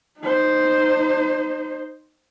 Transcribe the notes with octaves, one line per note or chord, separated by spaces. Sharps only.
D#4 C5